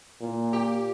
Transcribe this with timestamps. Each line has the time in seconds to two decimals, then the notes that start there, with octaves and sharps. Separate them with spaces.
0.20 A#2
0.53 G4